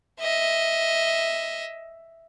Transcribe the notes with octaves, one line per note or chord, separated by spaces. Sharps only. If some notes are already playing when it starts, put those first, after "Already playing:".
D#5 E5